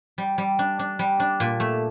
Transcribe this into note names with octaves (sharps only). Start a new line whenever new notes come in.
G3
G3
D4
D4
G3
D4
A#2
A3